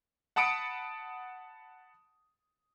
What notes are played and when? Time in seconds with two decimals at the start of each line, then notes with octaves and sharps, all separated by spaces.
0.36 F#5 A5 B5 D#6 C#7 D7